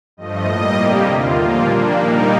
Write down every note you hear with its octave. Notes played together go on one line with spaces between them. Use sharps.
G2 F3 A3 D#5
A2 G3 A#3
C3 G3 A#3 G4
D#2 D3 A3 F4
A#2 F3 A#3 F4
A#2 G3 A#3 D4
A#2 G3 A#3 D#4